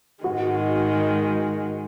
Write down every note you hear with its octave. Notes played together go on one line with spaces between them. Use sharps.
G#2 D#3 G#3 F#4